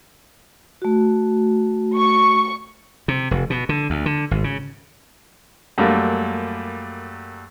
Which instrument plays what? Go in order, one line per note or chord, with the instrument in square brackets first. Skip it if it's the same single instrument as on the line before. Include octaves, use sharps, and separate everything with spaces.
[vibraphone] A3 F#4
[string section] C#6
[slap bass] C3
F1
B2
D3
D2
D3
G#1
C#3
[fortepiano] F#2 G3 A3 A#3